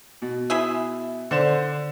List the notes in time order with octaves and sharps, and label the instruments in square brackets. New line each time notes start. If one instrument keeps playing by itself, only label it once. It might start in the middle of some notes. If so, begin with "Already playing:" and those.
[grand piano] B2
[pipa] E4 G#4 E5
[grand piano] D3 C5 E7